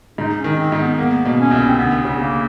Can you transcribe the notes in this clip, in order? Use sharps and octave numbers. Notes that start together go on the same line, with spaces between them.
G#2 D#4
C#4
D#3
C4
G#2
B3
A#3 B3
B2
C#4
C2
C4
D2 B3
C#3
A#3